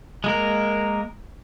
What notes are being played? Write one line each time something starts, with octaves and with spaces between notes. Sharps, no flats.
G#3 A#3 A#4